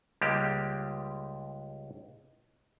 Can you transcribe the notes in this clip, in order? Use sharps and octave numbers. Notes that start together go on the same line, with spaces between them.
C#2 G3 G#3 A#3 G4